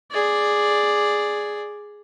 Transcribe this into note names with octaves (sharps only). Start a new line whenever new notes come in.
G#4 D5